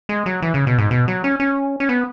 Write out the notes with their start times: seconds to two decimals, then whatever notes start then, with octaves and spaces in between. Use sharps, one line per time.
0.09 G#3
0.26 F#3
0.42 E3
0.54 C#3
0.67 B2
0.78 G#2
0.91 B2
1.08 F#3
1.24 C#4
1.40 C#4
1.80 C#4
1.89 B3